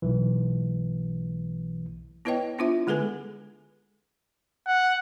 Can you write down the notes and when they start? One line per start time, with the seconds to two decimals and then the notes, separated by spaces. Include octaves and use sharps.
0.02 B1 E3
2.25 B3 E4 B4 C#5 D#5 G5
2.59 B3 D4 E4 F4 C5 E5
2.87 D3 G#3 G#4 A4 B4 G#5
4.67 F#5